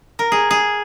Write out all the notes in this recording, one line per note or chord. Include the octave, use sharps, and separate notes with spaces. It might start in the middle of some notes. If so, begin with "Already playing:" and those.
A#4
G#4
G#4